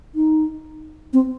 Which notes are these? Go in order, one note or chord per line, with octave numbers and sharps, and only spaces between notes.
D#4
C4